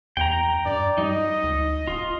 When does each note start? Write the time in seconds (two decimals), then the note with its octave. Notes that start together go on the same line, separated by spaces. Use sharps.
0.17 E2 G5 A#5
0.66 G2 D5
0.98 G3 D#4 D#5
1.44 D2
1.87 D1 F4